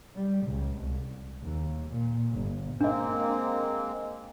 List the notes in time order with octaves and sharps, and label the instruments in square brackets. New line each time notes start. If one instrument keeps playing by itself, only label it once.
[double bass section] G3
C#2
C2
D#2
A#2
G1
[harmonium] G#3 A#3 C4 [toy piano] D4 D#5